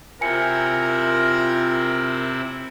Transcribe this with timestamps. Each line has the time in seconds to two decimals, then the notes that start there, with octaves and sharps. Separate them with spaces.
0.21 C3 C4 E4 F4 A#4 G#5 C#7